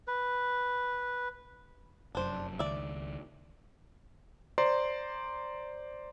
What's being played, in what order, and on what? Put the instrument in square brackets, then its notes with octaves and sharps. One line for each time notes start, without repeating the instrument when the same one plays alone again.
[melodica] B4
[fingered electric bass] F1 F#2 [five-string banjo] D4 C5
[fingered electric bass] C#2 D#3 [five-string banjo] D5 E5
[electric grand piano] C5 D5 A#5 C6